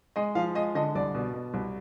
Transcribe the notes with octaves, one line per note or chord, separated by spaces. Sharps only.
G#3 D#5
F3 F5
G#3 D#5
D3 D#5
C2 D5
B2
B2
C2